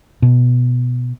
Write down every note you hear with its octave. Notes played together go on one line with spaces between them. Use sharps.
B2